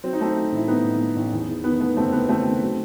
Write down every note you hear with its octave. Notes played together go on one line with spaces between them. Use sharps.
F#3 C4
D#4
F#3 A3 C4
A3
A1 E4
G2 B3 D#4
A1
A3
A1
E2
E2
D#3 B3
A3 B3
F#1 A3 C4
F#1 B3
D#3 A3 C4
A3
F#3